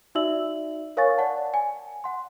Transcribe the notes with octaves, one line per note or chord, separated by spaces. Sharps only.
D#4 F#4 D5 E5 E6 F#7
A#4 C#5 F5 G#5 C#6 A6
D5 F#5 A5
G#5
F#5 C6